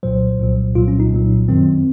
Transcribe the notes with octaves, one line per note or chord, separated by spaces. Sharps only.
C2 A#2 F#3 C5
C2 A#2 F#3
C2 A#2 F#3 F4
C#4
D#4
C2 A#2 F#3
F#2 D#3 F#3 C4